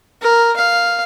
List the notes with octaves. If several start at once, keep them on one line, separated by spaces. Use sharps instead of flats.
A#4
F5